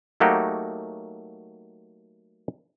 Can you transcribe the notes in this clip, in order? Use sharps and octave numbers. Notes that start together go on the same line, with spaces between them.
F#3 A3 A#3 D#4 F#4 G4